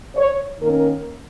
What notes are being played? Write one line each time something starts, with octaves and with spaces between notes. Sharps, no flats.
C#5
D#3 A#3 C#4 A#4